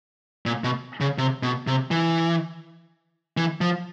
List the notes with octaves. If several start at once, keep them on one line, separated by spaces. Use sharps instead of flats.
A#2
B2
C#3
C3
B2
C3
E3
E3
F3